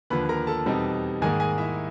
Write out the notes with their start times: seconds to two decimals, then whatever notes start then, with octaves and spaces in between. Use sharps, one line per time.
0.10 D#2 D3 F3 B4 B5
0.29 A#4 A#5
0.47 A4 A5
0.66 E2 B2 G3 C4 D#4
1.22 G#2 D#3 G3 A#3 G#4 G#5
1.40 G#4 G#5
1.58 E4 E5